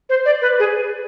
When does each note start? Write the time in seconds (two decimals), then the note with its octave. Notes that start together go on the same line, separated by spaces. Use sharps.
0.10 C5
0.26 D5
0.42 B4
0.60 G#4